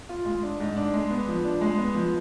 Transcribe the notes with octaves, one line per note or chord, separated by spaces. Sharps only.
F4
G#3
D4
G#2
D4
G#3
B3
F3
D4
G#3
B3
F3